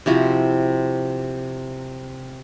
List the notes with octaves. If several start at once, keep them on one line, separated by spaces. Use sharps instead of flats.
C3 F3 E4 F#4